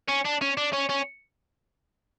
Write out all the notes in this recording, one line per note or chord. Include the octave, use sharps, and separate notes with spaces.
C#4
D4
C#4
D4
C#4
C#4